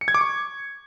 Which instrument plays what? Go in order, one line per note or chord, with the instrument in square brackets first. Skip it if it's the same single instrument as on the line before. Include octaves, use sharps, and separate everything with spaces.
[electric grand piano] C#7
G#6
D6
C#6